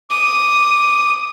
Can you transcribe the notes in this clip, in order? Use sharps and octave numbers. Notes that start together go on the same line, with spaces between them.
D6 D#6